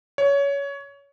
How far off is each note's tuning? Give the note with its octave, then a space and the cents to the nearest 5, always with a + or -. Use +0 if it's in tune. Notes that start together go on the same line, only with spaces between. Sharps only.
C#5 +20